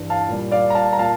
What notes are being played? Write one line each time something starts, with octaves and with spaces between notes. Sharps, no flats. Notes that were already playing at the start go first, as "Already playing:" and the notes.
Already playing: G2 E3 G3
F5 A5
A#2 G3
D5 F5
A#5
F5 A5
A#5
A#2 F5 A5